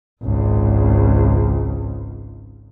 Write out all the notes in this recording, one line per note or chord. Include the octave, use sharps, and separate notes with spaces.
G#1 C#2